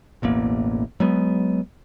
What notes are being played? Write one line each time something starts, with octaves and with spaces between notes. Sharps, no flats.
E1 A1 E2 A#3
F#3 G#3 B3